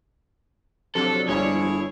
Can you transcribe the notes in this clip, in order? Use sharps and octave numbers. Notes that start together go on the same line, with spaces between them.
C3 F3 F#3 D4 A4
G1 F3 G3 G#3 E4 G#4 C#5